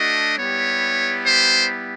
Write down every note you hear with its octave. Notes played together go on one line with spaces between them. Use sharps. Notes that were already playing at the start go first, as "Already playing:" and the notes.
Already playing: A3 D4 F#4 D#5
G3 B3 E4 G4 C#5
C5